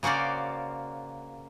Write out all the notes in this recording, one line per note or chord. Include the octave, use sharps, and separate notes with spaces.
C#3 A#3 F#4 C5 D5